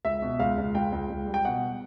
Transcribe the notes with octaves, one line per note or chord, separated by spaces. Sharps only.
C#2 E5
B2
C#2 F5
C#2
C#2 G5
C#2
C#2
G3
G5
B2 F#5